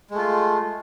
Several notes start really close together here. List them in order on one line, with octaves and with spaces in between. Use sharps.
G#3 A3 F4